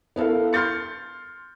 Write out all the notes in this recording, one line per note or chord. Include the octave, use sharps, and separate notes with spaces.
B3 E4 A4 A#4 F5
C6 F6 G6 A6 C#7